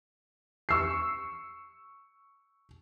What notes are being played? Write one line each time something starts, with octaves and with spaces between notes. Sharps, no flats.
C#6 E6 C7